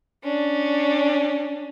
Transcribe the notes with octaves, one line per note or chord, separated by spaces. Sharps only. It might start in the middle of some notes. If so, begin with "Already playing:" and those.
C#4 D4